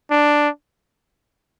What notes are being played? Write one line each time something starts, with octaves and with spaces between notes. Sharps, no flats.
D4